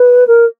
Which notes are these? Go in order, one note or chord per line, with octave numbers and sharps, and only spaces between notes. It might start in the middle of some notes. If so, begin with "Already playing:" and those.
Already playing: B4
A#4